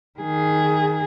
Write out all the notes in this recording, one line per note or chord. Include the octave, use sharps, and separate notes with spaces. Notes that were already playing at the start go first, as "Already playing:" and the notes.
D#3 G#4